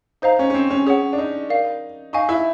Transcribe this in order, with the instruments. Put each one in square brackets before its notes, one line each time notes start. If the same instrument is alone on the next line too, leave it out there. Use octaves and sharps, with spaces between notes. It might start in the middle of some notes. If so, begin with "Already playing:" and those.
[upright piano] D#4 [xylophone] C5 F5 A#5
[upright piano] C#4
C#4
C4
C#4
[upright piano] C#4 [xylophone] G#4 C#5 F#5
[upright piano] D4
D#4
[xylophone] A#4 D5 F5
[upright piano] D#4 [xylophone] F5 G#5 C#6
[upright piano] E4